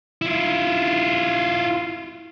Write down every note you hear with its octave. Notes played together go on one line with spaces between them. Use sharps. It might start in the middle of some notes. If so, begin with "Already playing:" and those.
E4 F4